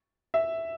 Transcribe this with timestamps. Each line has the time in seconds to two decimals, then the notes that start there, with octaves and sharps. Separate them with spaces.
0.34 E5